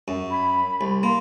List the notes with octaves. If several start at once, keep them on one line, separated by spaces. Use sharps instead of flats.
F#2
B5
C2
A#3 C6